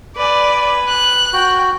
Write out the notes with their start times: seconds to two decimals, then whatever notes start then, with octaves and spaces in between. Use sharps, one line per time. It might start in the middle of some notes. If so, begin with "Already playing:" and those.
0.17 B4 D5 G#5
0.88 F#6
1.33 F#4 G5